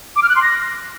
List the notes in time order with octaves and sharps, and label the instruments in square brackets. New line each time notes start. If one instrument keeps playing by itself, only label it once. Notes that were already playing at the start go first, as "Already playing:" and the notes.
[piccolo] D6
F6
F#6
C6
A#6